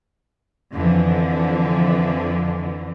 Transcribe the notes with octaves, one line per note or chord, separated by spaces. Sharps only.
F2 D3 E3